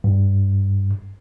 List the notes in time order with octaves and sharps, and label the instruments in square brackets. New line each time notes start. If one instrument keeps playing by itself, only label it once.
[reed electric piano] G2